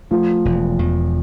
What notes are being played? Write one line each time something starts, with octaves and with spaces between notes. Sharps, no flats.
F3 A3
E1
E2